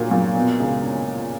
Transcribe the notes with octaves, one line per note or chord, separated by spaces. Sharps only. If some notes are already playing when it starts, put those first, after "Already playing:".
Already playing: A#2 F#3
A#2
B2
C#2
C#4